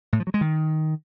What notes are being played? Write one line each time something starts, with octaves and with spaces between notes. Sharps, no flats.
A2
F3
F#3
G#3
D#3